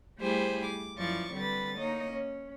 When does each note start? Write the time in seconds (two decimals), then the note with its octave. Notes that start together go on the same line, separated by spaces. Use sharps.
0.19 G3 A3 E4 G4 G#4 C5
0.64 D6
0.96 F#2 E3 F3 D5 C#6 A6
1.32 D3 G3 C4 B4 A6
1.77 A#3 D#4 C#5 D#5
2.12 C#4